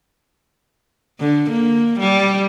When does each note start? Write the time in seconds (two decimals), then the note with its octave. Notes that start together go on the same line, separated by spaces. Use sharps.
1.20 D3
1.51 A#3
1.99 G3